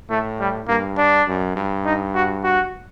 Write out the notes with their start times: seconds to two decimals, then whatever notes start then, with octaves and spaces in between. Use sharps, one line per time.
0.10 A2 A3
0.40 G3
0.68 G2 A#3
0.98 D4
1.27 F#2
1.56 G2
1.85 D#4
2.15 F#4
2.44 F#4